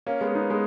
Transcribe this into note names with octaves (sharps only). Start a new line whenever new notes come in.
A#3 C#4
G#3 B3
B3 D#4
G#3 B3